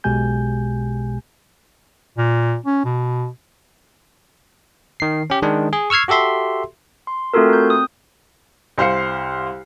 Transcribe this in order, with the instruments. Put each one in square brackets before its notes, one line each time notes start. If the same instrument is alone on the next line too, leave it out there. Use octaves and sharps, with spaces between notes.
[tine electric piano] B1 B2 G#3 G4 G#5 G6
[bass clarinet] A#2
C#4
B2
[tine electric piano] D#3 C7
C#4 G4
D#3 G#3 D4
G#4
C#6 E6 F6 G#6 C7
F#4 G4 A4 E5 C6
[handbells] C6
A3 C4 F4 F#4 A4 A#4
C4 G6
D#6
[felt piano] C2 C5 F5 C7 C#7